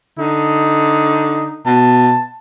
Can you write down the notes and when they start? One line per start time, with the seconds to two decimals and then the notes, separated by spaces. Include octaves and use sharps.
0.18 D3 D#4
1.66 B2 A5